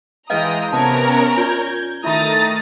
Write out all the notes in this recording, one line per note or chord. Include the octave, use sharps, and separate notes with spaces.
E3 G#3 B4 D#5 F5 G5 A#5 D#6
C3 B3 C#4 A#4 A5 A#5 G#6
F4 D5 G6 G#6
D#3 A3 E4 E5 A#5 B5 D#6 A6